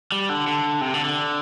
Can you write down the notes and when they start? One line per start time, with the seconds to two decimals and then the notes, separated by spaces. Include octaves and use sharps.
0.12 G3
0.29 D3
0.48 D3
0.81 C3
0.94 D3
1.05 D3